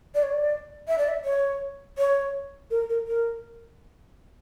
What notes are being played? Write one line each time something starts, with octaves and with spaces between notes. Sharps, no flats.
D5
C#5
D5
E5
D5
E5
C#5
C#5
A#4
A#4
A#4